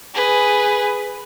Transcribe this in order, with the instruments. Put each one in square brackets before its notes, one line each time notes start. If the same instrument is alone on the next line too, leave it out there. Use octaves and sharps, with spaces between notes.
[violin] G#4 B4